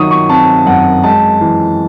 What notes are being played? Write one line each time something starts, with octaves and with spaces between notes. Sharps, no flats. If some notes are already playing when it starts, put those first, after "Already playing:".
Already playing: D#3 F#3 C#6 D#6
C#6
C4 A5
F#2 F#5
G#3 A5
E3